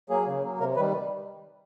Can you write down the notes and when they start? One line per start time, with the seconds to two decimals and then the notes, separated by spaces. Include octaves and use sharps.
0.10 F#3 A#3 G#4
0.26 C#3
0.43 F#3 A#3
0.59 C3 A#4
0.76 D#3 G3 B4